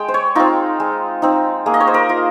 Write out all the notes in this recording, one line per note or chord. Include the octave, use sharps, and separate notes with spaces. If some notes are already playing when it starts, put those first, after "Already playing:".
Already playing: G#3 G5
C5
C#5
C4 D#4 F4
G#3
C4 D#4
A#3 G#4
D#5
C#5
C5
A#4
F4